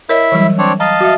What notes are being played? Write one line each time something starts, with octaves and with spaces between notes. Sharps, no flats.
E4 A#4 C#5 D#5 E5
E3 F#3 G3
C4 D4 C#5
D#5 F5 A5 A#5
F#4 E5